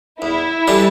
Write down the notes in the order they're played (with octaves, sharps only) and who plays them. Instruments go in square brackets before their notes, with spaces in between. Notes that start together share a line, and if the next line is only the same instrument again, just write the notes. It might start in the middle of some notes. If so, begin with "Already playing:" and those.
[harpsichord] E2 [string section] E4
[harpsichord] E3 G3 D4 A4